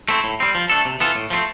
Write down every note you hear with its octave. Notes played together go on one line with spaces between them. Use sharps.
A3 C4 E4
A2
G3 C4
F3
A3 D4 A4
C3
E3 B3 F4 A4
A2
F3 A3 C4